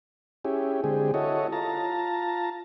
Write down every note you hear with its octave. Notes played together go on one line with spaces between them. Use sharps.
C#4 E4 G4 G#4
D3 G#3 C4 G4 G#4
E4 F#4 A4 C#5 D#5
F4 A5 A#5